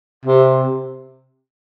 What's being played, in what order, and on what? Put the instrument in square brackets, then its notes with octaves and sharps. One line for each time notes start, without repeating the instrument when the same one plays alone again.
[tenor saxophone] C3